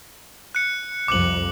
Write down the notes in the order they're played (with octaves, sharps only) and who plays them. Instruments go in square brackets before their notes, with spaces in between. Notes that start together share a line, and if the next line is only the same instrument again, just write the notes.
[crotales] F#6 C#7
[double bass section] C2 F2 [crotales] D6 F#6 F#7